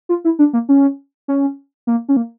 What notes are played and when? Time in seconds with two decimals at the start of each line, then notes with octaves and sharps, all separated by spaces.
0.09 F4
0.25 E4
0.39 D4
0.53 A#3
0.69 C#4
1.28 C#4
1.87 A#3
2.09 C#4
2.17 A#3